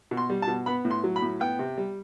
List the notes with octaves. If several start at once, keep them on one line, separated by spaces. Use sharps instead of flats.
B2
C6
G3
A5
B2
B3 B5
A2
C6
F#3
B5
A2
B3 G5
C3
G3